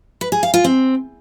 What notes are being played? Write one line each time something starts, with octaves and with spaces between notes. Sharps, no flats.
B4
G#4
F5
F4
C4